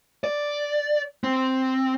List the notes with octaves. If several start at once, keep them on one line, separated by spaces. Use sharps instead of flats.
D5
C4